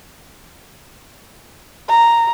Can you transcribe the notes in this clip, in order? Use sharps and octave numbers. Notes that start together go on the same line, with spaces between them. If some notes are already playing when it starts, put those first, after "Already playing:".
A#5